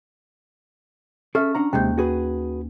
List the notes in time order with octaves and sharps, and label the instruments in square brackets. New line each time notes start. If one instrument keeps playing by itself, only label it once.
[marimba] C#4 F6 [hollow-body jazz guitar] G#4 A4 E5
[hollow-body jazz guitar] D4 F#5 A#5
[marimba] D#2 A#3 G6 [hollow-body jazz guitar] C3 G#3 C4
[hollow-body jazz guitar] F#4 G#4 B4